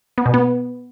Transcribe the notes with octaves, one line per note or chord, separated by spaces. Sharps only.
B3
B2
B3